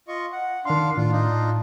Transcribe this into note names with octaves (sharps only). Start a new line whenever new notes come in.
F4 D#5 C#6
F#5
D#3 D4 F5 C6
A2 D4 F4
D4 D#4 F4